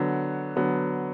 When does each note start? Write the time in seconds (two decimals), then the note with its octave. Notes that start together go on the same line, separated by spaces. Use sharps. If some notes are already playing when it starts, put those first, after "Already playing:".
Already playing: D3 F#3 B3 F#5
0.56 D3 F#3 B3